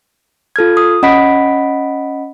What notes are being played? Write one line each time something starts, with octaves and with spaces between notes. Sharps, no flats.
F4 A4 F6 G#6
D#6
C#4 D#5 F#5 B5 B6 D7